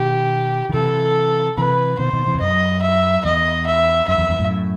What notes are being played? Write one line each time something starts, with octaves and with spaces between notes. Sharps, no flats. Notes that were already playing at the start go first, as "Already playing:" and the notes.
Already playing: B2 D#3 G4
D#3
C3 E3 A4
C3 E3 B4
B2 D#3 C5
B2 D#3
C3 E3
E2
F#2 D#5
E5
E2 D#5
E5
F#2 E5
E2
E2 G2
F#2 A2